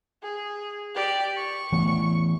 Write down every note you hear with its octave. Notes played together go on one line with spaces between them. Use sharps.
G#4
G4 D5
C#6
E3 A3 B3